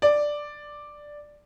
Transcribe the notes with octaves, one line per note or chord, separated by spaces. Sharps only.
D5